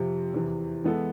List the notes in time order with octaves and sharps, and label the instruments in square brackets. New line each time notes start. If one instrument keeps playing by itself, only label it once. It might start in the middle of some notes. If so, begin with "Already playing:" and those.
Already playing: [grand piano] F2 C3 F3
E2 C3 E3
E3 G#3 B3 E4 A4